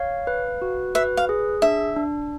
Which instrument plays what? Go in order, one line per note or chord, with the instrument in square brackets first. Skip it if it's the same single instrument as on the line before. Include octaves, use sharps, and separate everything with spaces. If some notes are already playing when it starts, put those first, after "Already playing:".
Already playing: [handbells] C#5 F5
B4
F#4
[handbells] B4 [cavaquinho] E5
[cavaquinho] F5
[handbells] G#4
[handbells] D4 [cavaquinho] E5
[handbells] D4